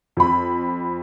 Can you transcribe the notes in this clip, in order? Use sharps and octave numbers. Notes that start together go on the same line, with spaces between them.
F2 B5